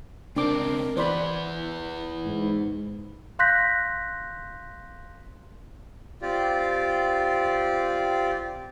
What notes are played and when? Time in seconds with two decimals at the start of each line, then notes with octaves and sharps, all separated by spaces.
0.36 C#2 C4 D4 A#4 D6
0.97 E3 B3 E4 C5 D5 B5
2.25 G#2
3.39 F5 C6 F#6 G6 A#6 B6
6.22 C4 F4 G4 D5